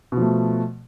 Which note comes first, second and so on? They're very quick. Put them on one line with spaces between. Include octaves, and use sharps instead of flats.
B2 F3 A3